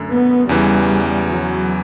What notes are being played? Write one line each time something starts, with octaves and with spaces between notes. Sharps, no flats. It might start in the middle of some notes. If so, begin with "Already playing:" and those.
Already playing: F#2 D3 A3
B3
E2 C#3 E3 G3
F#3